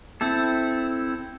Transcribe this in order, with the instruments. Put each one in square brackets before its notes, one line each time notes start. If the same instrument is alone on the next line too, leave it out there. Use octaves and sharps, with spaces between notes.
[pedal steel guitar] C4 E4 A4